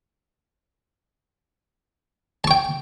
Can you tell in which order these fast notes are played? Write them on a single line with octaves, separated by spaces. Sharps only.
A5 C#6 G5